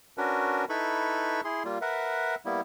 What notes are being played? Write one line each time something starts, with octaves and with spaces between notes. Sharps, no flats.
C#4 D4 F#4 A#4 B4
D#4 E4 A4 B4 B5 C#6
E4 G#4 C6
G3 A#3 F4
A#4 B4 E5 F#5
G3 A#3 B3 E4